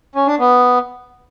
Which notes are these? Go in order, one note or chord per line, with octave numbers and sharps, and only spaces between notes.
C#4
D4
B3